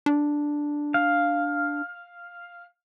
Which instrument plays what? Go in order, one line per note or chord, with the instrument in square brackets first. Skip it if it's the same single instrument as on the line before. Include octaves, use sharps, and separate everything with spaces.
[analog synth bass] D4
[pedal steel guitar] F5